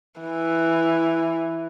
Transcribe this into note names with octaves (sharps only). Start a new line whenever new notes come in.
E3